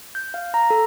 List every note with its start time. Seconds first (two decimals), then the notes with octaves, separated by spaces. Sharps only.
0.15 G6
0.34 F5
0.54 A#5
0.70 A4